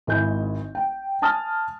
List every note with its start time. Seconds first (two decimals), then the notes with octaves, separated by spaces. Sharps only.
0.07 G#1 G#2 E4 G#5 G6
0.75 G5
1.22 G#5 A5 D#6 F6 A6